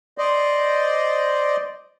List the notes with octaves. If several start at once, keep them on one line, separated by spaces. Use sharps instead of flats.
C5 D5 D#5